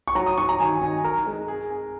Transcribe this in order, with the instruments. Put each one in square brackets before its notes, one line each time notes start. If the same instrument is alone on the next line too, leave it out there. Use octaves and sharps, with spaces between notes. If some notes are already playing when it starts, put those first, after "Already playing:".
[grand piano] C#6
[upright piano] F#3 [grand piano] A#5
[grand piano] D#6
[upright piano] F#3 [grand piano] C#6
[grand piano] A#5
[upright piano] D#3 [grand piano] G#5
[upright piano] D#3 [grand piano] G#5
[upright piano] A#4 [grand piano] A#5
[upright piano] G#3
G#4
G#4